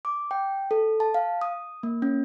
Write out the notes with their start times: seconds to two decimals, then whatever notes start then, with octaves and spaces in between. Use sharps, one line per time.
0.05 D6
0.31 G5
0.71 A4
1.00 A5
1.14 F5
1.41 D#6
1.83 A#3
2.02 C#4